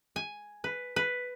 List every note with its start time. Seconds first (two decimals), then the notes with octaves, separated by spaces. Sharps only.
0.16 G#5
0.64 B4
0.96 B4